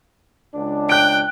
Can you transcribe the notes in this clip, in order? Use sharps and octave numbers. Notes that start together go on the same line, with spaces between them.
C#2 D4
G5 F#6 D7